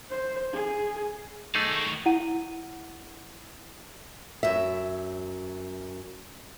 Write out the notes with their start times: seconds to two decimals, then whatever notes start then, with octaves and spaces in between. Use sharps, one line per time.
0.10 C5
0.53 G#4
1.55 B1 A3 D#4 G#4 D5
1.71 D#3 F#4
2.06 E4 F#5 D#7
4.43 F#2 E5